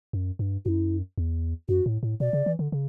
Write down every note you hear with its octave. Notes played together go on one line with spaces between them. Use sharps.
F#2
G2
F#2 E4 F#4
E2
F#2 F#4
A2
A2
B2 D5
C#3
E3
D3
C#3